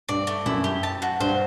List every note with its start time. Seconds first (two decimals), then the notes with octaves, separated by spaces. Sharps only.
0.09 G2 D5
0.27 A3
0.46 F#2 E4
0.64 G4
0.83 A5
1.02 F#4
1.20 G2 C5